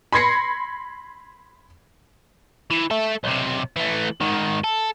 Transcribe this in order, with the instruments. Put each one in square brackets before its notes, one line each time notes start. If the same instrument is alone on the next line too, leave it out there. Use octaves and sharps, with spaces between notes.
[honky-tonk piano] B5 C6 G#6 A#6 C7 C#7
[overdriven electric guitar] E3
A4 E5
B1 C3
E3 A3
G#2 D#3
A4